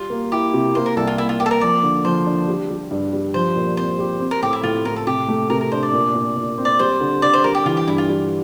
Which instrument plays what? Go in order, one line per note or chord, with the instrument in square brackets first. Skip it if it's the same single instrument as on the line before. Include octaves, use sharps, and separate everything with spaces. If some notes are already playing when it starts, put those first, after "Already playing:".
Already playing: [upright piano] G3 [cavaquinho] F4
[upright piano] A#3
[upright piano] E4 [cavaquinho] G4
[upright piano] C3
[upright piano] A#3 [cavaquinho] C5
[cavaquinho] A#4
[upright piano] C2 [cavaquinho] A4
[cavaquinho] F4
[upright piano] A#3 [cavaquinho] E4
[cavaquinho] F4
[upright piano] A#3 [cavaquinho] G4
[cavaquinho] A4
A#4
[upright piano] F3 [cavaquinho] D5
[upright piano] D3
[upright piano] F3 [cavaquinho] C5
[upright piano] D4
G3
G3
G2
G3
[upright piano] F3 [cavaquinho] C5
[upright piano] A#2
[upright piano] C4 [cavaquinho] C5
[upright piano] G4
C4
[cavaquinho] A#4
[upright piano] A2 [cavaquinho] G4
[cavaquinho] E4
[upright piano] A2 [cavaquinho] F4
[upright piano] A2 [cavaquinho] A#4
[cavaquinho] A4
[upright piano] C3 [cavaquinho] G4
[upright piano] A3
[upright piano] C3 [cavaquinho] A#4
[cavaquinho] A#4
[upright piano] D4 [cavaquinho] C5
[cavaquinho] D5
[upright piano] A#2
A#2
A#2
C4
[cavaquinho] D5
[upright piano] G3 [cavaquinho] C5
[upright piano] D3
[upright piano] D3 [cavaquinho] D5
[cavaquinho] C5
[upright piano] G3 [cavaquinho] A#4
[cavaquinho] G4
[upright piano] E3 [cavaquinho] F4
[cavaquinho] G4
[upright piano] G2 [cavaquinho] E4
[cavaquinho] F4
[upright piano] G3